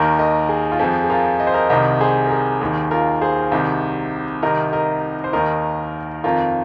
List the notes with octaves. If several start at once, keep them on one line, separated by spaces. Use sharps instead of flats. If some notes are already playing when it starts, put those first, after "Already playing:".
Already playing: D#2 D#3 A#4 D#5
A#4 D#5
G#4
F4
F2 F3 G#4
G#4
F4 A#4
D#5
C5
A#4 D#5
C2 C3 D#3 A#4 D#5
G#4 C5
A#4
G#4
D#2 D#3 G#4
F4 A#4
G#4 C5
C2 C3 D#3
C2 C3 D#3 A#4 D#5
A#4 D#5
C5
D#2 D#3 A#4 D#5
F2 D#3 F4 A#4